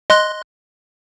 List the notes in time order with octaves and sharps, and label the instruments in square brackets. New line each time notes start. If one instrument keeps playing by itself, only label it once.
[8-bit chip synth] D#5 C6 F#6